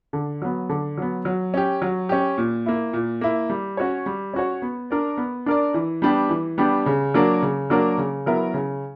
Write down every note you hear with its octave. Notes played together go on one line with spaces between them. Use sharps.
D3
F#3 B3
D3
F#3 B3
F#3
C#4 G4
F#3
C#4 G4
A#2
A#3 E4
A#2
A#3 E4
G3
C#4 F#4 C#5
G3
C#4 F#4 C#5
B3
D4 A#4 D5
B3
D4 A#4 D5
E3
G3 B3 D4 G4
E3
G3 B3 D4 G4
C#3
F#3 A#3 D4 A#4
C#3
F#3 A#3 D4 A#4
C#3
F#3 B3 E4 A#4
C#3